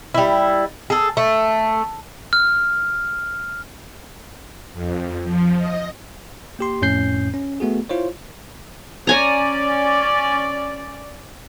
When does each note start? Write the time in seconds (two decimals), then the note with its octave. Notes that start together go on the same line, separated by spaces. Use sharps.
0.14 G3 E4
0.90 G#4 A4
1.17 A3
2.33 F6
4.73 F2
5.24 F3
5.57 D#5
6.59 A#3 G4 C6
6.82 F2 A2 C#4 G6 C7
7.34 C#4
7.60 A3 B3 F#4 G#4
7.89 E4 F4 C5 C#5
9.07 C#4 C#5 D5 G#5 A#5